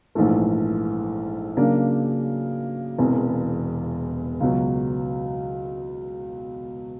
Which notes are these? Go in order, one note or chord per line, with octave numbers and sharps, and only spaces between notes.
A#1 G#2 E3 A3
C#3 F#3 A#3 D4
E1 E2 C3
C#2 B2 F#3